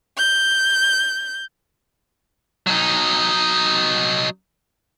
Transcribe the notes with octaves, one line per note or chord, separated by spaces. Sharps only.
G6
F#3 D#4